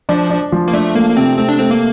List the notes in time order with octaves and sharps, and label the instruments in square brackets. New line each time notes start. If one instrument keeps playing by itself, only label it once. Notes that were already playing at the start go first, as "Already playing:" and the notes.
[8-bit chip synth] F3 [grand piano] D4
[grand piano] D4
F3
[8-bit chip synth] A#3
[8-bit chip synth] A3 [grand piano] D4
[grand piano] A3 [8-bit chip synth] A#3
[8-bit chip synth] A#3
[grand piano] C3 [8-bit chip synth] C4
[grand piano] A3 [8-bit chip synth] C4
[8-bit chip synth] D4
[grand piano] A3 [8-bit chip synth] C4
[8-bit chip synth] A#3